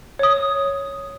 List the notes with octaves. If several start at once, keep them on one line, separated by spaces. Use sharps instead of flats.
C#5 D#6